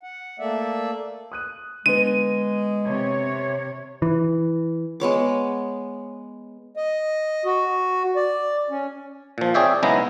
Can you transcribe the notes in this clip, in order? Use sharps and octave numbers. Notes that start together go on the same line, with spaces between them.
F#5
A3 A#3 D5 E5
D#6 F#6 D#7
D3 G#3 B3 D#7
C3 C#5
E3
G#3 B3 C#5 D6
D#5
F#4
D5
C#4
A#2 F3
C4 G#4 C#5 D5 E5 G5
B1 C#3 G#3 B3 E4 A#5